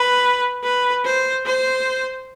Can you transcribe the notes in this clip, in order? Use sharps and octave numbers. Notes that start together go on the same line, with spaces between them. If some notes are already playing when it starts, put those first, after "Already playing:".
Already playing: B4
B4
C5
C5